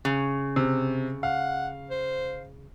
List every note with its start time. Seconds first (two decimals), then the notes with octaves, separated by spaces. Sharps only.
0.05 C#3
0.56 C3
1.23 F5 F#5
1.90 C5